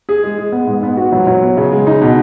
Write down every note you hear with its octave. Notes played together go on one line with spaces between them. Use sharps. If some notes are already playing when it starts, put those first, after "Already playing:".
G#4
G#3
G#3
B3
G#2
B3
F#4
F#3
F#3
B3
C#3
G#3
D#4
B2